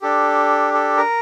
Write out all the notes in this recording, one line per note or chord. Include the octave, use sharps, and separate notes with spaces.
D4 G4 A4
A4
A#4